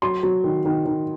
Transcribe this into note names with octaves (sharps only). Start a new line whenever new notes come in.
F#3 C6
F#3
D#3
D#3
D#3